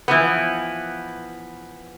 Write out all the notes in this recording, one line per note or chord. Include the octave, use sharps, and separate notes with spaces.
E3 F3 B3